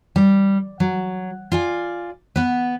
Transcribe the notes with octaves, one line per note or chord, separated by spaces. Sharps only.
G3
F#3
F4 D5 G#5
B3 B4